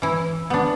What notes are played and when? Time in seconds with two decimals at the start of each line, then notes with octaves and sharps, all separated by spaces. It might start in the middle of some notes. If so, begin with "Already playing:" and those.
0.02 E3 E4
0.50 B3 D4